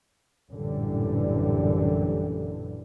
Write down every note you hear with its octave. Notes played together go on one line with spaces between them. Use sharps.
A1 F#2 A#2 D3 E3 G3